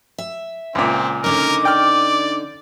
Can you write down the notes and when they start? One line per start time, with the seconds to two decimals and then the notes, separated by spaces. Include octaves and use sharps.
0.18 E5
0.75 C#2 A#2 C4
1.24 D3 C#4 D#4 A#4 D6
1.65 D5 G5 F6